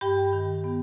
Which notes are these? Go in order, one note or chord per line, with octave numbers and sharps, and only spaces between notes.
G2 G4 G5
D#3
B3